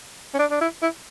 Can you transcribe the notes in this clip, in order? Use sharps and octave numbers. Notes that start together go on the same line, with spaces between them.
C#4
D4
D4
E4
E4